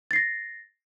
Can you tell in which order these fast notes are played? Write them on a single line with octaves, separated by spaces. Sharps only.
A6 C7 A#6